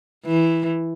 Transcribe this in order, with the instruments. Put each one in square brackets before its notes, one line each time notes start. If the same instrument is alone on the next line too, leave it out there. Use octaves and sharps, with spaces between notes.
[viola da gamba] E3